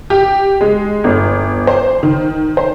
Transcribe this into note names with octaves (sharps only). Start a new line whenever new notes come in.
G4
G#3
G1
C5
D#3
C5